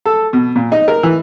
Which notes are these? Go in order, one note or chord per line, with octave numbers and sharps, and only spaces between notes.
A4
B2
A#2
D#4
A#4
E3